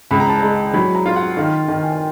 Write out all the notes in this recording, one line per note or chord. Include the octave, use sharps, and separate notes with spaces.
C#2 B5
A#5
A5
G#3 A#5
F#3 B5
A#5
F4
F#5
D#3 F5
D#3 G5
G#5
G5